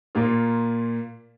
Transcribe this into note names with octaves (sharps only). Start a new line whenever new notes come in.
A#2 A#3 F4